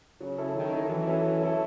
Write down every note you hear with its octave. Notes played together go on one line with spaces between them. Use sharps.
C#3 F#3
C#4 E4 A4
D#3 F#3
C#4 E4 A4
E3 F#3
C#4 E4 A4
F#3
C#4 E4 A4